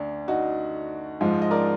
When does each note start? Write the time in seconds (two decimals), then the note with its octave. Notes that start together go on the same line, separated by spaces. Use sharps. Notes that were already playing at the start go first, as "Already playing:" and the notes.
Already playing: D2 D4
0.28 D#4 F#4
1.21 G#2 F3 G#3
1.42 D#5
1.51 A#4 D5